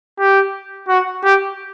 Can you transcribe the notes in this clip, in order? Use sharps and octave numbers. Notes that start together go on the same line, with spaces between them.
G4
F#4
G4